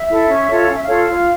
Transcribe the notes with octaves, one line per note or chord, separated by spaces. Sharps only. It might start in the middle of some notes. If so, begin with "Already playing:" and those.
Already playing: E5
E4 A4
C#4
F4 A4 C#5
C#4 F5
E5
F5
F4 A4 C#5
F4